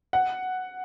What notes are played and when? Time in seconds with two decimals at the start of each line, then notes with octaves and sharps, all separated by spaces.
0.13 F#5